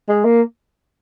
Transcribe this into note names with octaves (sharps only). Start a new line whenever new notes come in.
G#3
A#3